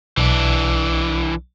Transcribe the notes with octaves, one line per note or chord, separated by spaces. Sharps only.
B1 E3 D4